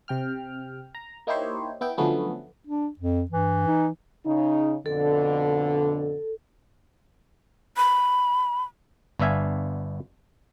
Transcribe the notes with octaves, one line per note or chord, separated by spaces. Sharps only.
C3 G5 F6
A#5
A#3 D#4 E4 G4 C5 C#5
B3 E4 G5
D3 F3 F#3 A3 B3 C#4
D4
F2
G2 E3
D#4
C#3 D#4
F2 B2 D3 A4
B5
G1 B3 D4 E5 F5 G#5